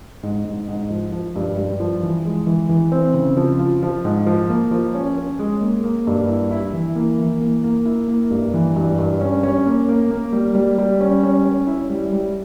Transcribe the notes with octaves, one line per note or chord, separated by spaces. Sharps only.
G#2
G#2
G#2
F3
F3
G2
G2
F3
E3
G#3
E3
E3
C4
C#3
F3
F4
F3
G#2
F3
A#3
F3
C#4
C#4
G#3
A#3
A#3
G2
E4
E4
E3
A#3
E3
A#3
A#3
E4
A#3
G2
E3
G2
G2
C#4
C#4
A#3
A#3
A#3
G3
G3
G3
C#4
C#4
C#4
E4
G3
G3